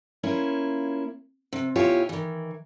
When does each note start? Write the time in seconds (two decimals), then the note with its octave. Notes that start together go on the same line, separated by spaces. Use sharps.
0.23 A#3 C#4 E4 F4
1.53 C3
1.75 B2 E4 F4 G4 C#5 G#5
2.09 D#3 E3